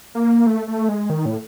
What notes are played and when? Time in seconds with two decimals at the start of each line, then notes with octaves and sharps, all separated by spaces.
0.15 A#3
0.47 A3
0.68 A3
0.89 G#3
1.10 D#3
1.26 A2